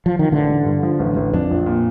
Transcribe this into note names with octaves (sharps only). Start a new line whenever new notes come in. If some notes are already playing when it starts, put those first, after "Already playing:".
F3
D#3
A1 D3
A1
G2
F3
A1
A1
F2 D4
A#1
A#2